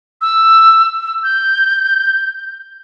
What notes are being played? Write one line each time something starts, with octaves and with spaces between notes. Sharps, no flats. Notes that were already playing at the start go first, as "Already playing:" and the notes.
E6
G6